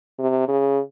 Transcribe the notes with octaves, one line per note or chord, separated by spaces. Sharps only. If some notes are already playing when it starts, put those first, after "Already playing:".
C3
C#3